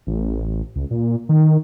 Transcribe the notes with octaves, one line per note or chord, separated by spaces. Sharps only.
A1
C#2
A#2
D#3